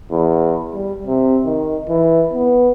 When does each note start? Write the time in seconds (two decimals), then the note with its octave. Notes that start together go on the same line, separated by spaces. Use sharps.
0.11 E2
0.74 G3
1.07 C3
1.45 D#3
1.89 E3
2.33 B3